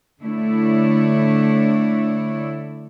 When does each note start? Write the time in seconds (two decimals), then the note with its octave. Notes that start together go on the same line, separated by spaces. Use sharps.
0.20 D3 A3 D4 E4 C#5